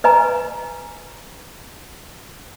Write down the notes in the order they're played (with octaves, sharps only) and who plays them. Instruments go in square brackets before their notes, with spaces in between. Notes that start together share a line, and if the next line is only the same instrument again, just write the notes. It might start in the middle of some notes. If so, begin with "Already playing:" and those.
[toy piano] B4 D#5 G#5 A#5